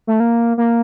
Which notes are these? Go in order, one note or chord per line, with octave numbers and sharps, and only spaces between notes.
A3
A#3
A#3